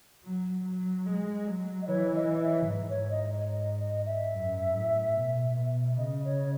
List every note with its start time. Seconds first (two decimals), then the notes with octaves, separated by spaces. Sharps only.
0.24 F#3
0.65 F#3
1.06 G#3
1.47 F#3
1.82 D#5
1.87 E3 C#5
2.15 D#5
2.42 E5
2.69 G#2
2.90 C#5
3.11 D#5
3.52 D#5
3.79 D#5
4.06 E5
4.33 F#2
4.74 A2
5.15 B2
5.56 B2
5.98 C#3 D#5
6.25 C#5